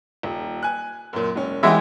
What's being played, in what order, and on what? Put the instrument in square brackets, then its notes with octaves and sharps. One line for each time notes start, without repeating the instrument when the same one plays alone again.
[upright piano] D#1
G#5 F#6
F#2 A#2
E1 C#4
[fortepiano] E3 G#3 E5 [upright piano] E4 F#5 G5